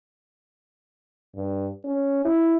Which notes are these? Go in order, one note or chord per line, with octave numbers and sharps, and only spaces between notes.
G2
C#4
E4